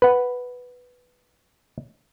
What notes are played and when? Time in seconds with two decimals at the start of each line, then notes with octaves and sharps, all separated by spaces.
0.02 B4 F#5